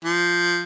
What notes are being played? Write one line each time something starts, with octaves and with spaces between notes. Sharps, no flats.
F3